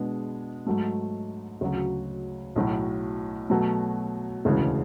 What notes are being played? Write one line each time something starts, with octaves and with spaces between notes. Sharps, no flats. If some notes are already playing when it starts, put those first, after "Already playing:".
Already playing: B2 G#3 B3 D4
G#2 F#3 A3
D2 C#3 F#3
B1 A2 F#3
B2 F#3 A3
E1 D2 C#3 E3 G#3